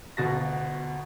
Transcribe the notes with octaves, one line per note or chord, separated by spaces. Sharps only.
G1 D2 B2 F#4 A6 A#6